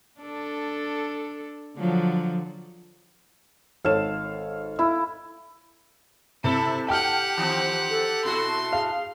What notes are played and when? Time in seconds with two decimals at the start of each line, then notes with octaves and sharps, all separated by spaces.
0.21 D4 A4
1.77 D3 F3 F#3
3.85 G#1 A4 C#5 F5 E7
4.79 E4 E6
6.44 C3 E4 A4
6.89 G4 F#5 G5 F6
7.37 D#3 F3 C4
7.90 A4
8.25 B2 E4 F#4 C6
8.73 G#4 F5